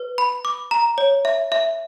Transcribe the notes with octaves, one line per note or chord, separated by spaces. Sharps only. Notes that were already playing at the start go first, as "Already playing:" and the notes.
Already playing: B4
B5
D6
A#5
C#5
E5
E5